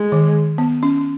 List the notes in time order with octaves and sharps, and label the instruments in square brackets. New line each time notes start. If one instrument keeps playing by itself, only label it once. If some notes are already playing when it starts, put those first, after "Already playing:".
Already playing: [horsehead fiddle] G#3
[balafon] D#3
B3
C#4